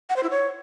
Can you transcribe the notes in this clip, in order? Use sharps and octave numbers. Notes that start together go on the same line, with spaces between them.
F#5
C5
E4
C#5